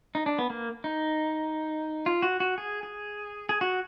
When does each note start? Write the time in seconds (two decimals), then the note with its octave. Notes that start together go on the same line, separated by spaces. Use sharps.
0.15 D#4
0.26 D4
0.39 B3
0.50 A#3
0.84 D#4
2.06 F4
2.22 F#4
2.40 F#4
2.58 G#4
2.83 G#4
3.49 G#4
3.61 F#4